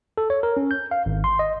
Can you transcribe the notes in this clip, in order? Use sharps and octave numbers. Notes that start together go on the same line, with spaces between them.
A4
C#5
A#4
C#4
G6
F5
G#1
C6
D#5